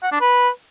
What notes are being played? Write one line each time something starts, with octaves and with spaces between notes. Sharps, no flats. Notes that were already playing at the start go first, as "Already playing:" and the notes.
F#5
D4
B4